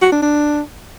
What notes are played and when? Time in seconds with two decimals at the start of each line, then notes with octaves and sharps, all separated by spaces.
0.02 F#4
0.12 D4
0.22 D4